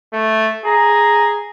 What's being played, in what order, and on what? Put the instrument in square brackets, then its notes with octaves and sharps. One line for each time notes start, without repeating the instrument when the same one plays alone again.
[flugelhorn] A3
[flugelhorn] G#4 [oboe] A#5